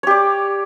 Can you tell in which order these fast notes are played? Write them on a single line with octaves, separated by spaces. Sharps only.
C#5 G4 D5